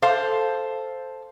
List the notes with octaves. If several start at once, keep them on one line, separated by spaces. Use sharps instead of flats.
A4 C5 F5